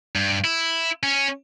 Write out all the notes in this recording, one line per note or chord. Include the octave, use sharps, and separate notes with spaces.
G2
E4
C#4